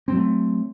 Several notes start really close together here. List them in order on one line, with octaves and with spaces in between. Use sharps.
C4 F#3 A3